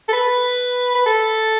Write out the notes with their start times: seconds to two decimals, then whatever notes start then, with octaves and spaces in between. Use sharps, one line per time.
0.08 A4
0.12 B4
0.95 B4
1.06 A4